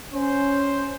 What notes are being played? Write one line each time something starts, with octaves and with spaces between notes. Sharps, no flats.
C#4 C5